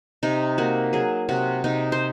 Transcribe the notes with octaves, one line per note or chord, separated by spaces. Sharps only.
C3 D#4
A#3 F#4
F#3 G#4
C3 F#4
C3 D#4
C5